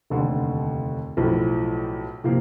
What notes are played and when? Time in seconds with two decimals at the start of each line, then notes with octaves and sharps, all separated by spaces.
0.10 F1 D#2 D3
1.17 B1 A2 F3
2.24 C3 F3 A#3